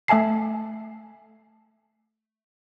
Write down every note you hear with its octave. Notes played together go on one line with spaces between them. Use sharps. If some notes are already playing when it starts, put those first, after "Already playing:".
A3 E5 G#5 A5 C7